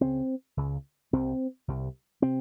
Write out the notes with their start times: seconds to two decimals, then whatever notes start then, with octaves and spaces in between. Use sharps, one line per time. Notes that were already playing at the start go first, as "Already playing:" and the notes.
0.01 C#2 C#3 C4
0.57 C#2 C#3
1.13 C2 C3 C4
1.68 C2 C3
2.22 C3 C4